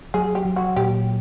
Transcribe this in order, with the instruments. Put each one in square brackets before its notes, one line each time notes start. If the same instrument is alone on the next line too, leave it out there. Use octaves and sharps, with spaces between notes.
[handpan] F#3 [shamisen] G#4
[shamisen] G4
[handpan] F#3
[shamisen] F#4
[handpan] A#2 [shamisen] G4